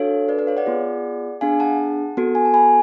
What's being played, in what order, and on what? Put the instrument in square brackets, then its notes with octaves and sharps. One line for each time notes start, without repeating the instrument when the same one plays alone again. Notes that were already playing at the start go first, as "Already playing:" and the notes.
Already playing: [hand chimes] D4 F#4 A4 C#5 F5
B4 D5
B4 D5
C#5 F5
D5 F#5
B3 F4 G#4
B3 D4 G#4 F5 G#5
F#5 A5
B3 F#4 A4
G#5
A5
G#5 B5